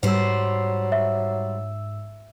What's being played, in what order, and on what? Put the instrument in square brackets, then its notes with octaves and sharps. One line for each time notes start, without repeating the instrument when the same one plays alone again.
[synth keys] G#2 E6 [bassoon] F#3 [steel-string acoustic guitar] G3 C5
[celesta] E5